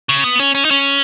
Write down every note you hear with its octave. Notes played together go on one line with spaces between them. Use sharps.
C#3
B3
C#4
C#4
D#4
C#4